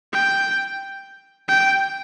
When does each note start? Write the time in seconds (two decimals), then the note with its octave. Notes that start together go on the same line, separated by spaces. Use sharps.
0.13 G5
1.48 G5